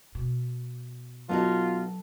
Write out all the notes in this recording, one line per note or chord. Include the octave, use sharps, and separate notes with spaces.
B2
F#3 B3 D#4 F4 F#4 A4 A5